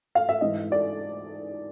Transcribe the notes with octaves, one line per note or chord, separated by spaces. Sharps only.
F5
E5
G#2 E3 D#5
D5